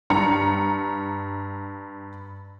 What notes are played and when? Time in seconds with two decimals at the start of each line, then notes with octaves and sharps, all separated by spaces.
0.10 G2 A#5 C#7